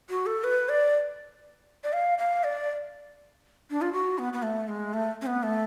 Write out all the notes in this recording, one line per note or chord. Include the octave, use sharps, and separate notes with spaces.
F#4
A4
B4
D5
D5
F5
F5
D5
D4
F4
F#4
B3
B3
A3
G#3
A3
C#4
B3
A3